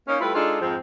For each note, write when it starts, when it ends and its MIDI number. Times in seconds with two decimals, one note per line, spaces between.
0.08 0.17 58
0.08 0.17 61
0.08 0.17 63
0.21 0.33 55
0.21 0.33 57
0.21 0.33 64
0.21 0.33 65
0.21 0.33 71
0.35 0.59 56
0.35 0.59 62
0.35 0.59 63
0.35 0.59 65
0.35 0.59 68
0.35 0.59 69
0.61 0.76 41
0.61 0.76 44
0.61 0.76 53
0.61 0.76 56
0.61 0.76 60